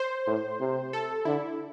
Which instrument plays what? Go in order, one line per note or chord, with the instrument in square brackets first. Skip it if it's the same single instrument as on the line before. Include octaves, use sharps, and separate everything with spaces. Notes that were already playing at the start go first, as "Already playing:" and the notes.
Already playing: [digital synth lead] C5
[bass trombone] A2
C3
[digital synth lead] A4
[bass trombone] D3 [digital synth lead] E4